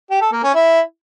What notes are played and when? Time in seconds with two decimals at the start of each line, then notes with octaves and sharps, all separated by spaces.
0.10 G4
0.21 A4
0.32 A#3
0.43 C#4
0.54 E4